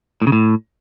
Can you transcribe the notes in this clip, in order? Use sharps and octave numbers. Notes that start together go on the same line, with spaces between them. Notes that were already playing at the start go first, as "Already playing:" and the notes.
A2
C#3
A2